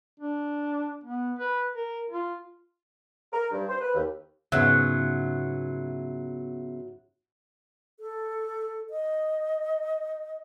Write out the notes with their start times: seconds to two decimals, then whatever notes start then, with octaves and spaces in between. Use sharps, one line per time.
0.20 D4
1.04 B3
1.39 B4
1.75 A#4
2.11 F4
3.33 A#4
3.51 G2
3.68 C5
3.80 B4
3.94 D#2
4.52 G#2 C#3 F#3 B3 F4 E5
8.00 A4
8.90 D#5